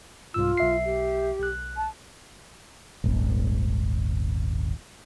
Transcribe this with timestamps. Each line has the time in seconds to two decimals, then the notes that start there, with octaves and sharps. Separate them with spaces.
0.34 C2 G#2 F4 E6
0.57 B1 E5 C7
0.85 G4
1.40 B1 F#6
1.76 A5
3.04 D#1 G#1